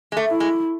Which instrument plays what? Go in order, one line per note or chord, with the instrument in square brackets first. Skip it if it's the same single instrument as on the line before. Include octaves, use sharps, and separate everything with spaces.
[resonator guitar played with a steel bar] G#3
A3
[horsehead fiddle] E4
[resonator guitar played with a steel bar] G#3